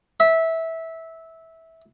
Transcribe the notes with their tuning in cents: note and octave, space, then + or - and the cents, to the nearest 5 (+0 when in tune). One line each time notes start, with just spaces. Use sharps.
E5 -15